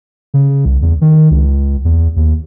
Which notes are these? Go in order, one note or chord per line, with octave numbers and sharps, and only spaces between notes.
C#3
C2
E2
D#3
C#2
E2
D#2